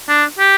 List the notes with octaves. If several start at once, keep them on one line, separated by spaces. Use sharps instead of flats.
D4
G4